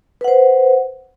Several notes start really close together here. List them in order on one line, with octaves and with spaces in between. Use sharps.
B4 F#5 C5